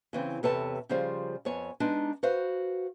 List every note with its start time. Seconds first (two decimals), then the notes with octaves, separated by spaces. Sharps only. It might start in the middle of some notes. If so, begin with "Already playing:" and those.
0.13 C#3 E3 C4
0.43 E2 C3 A4 B4 C#5 A5
0.89 C#3 F3 G3 F4 G#4 C5
1.45 F2 B3 C#5 G#5
1.80 G#3 B3 D4 D#4
2.23 F#4 B4 C5 F5